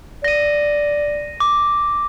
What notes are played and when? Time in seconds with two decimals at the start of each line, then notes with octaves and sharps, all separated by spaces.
0.24 D5 A#6 D#7
1.40 D6